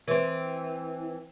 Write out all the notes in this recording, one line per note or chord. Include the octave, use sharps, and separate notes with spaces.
E3 C4